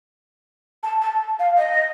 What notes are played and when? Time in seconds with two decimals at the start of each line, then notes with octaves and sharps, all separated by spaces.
0.83 A5
1.02 A5
1.39 F5
1.58 D#5